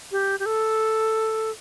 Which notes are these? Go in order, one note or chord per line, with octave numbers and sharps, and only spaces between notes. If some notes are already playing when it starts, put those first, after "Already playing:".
G4
G4
A4